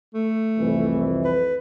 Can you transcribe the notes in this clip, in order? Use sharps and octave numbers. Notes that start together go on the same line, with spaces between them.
A3
C2 F2 E3
B4